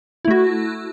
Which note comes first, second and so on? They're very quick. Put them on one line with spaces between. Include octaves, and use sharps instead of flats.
E4 A3 F#4